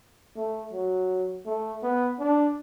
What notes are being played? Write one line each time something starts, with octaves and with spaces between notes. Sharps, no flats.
A3
F#3
A3
B3
D4